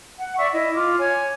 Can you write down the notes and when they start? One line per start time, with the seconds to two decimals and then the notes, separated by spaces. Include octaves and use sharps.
0.20 F#5
0.38 D5 E5 C#6 E6
0.53 E4 D#5
0.75 F4 D6
0.98 C#5 G#5